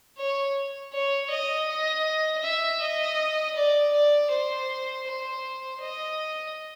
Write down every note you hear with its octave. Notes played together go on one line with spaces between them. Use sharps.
C#5
C#5
D#5
D#5
E5
D#5
D5
D5
C5
C5
D#5